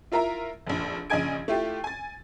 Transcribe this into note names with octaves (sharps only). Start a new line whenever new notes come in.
E4 F4 A#4 E5 A#5
F1 A#1
A#1 C#3 D#5 G#5 G#6 D7
A3 E4 F4 G4
G#5 A6